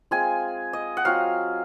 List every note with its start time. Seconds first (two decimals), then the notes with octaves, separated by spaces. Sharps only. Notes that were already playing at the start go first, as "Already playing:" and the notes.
0.11 G#3 C4 F4 G#5
0.73 D#5
0.97 F#5
1.05 F#3 C4 F4 F5